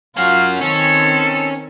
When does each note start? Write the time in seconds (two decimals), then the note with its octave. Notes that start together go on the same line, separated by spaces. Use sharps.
0.17 C#4 F4 F#4 F5
0.61 D#3 C4 C#4 A4